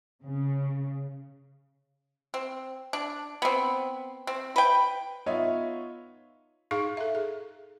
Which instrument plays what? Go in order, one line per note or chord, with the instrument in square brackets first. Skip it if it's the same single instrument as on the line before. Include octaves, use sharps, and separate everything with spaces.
[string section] C#3
[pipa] C4
D4
B3 C4
C4
B4 G5
[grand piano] B3 D#4 F4 C#5 E5
[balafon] D#4 G#4 F5 C#6
A4 E5
G#4